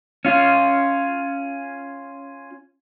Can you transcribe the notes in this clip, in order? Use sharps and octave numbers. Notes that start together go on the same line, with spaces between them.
C#4 F4